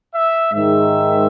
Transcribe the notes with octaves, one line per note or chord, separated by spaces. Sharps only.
E5
G#2 D#3 G#3 E5